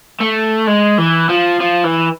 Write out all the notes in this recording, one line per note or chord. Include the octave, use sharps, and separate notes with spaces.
A3
G#3
E3
F3
F3
E3